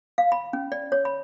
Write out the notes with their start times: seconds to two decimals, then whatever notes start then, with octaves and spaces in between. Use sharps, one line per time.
0.18 F5
0.32 B5
0.53 C#4
0.72 D5
0.92 C#5
1.05 B5